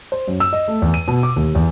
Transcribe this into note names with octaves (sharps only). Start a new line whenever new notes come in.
C5
F#2
E6
D#5
A3
E2
D#7
B2
D6
D#2
E2